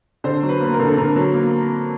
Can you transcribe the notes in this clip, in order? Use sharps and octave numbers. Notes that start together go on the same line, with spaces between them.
D3 C5
F#3
B4
A#3 B4
A#4
D3
A4
D3 A#4
F#3
A#3